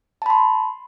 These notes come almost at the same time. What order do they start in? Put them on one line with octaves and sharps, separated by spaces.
A5 B5 C6